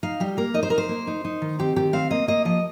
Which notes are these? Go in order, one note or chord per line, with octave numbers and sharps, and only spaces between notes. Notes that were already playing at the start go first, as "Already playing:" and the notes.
D#4 F5
G3 G4
A#3 A#4
D#4 D#5
C5
D#4 A#4
C5
A#3
D#4
D#4
D#3
C4 G4
D#3 G4
C4 F5
A#3 D#5
A#3 D#5
F3 D#5